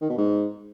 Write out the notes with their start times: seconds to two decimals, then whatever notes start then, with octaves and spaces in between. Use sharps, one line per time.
0.01 D#3
0.10 B2
0.18 G#2